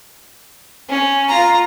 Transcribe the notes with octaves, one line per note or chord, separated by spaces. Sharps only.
C#4
F4 A#5